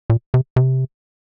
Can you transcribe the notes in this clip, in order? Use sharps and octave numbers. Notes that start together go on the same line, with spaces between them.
A#2
C3
C3